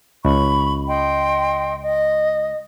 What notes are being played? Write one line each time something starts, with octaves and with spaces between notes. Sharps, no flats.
C#2 B5 C#6
D#5 G5 C6
D#5